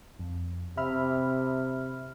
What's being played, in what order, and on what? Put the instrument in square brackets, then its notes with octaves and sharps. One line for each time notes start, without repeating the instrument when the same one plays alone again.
[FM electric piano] F2
[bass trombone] C3 [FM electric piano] E5 B5 F6